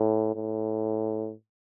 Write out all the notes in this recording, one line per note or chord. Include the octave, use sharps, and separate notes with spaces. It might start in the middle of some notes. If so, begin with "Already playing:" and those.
Already playing: A2
A2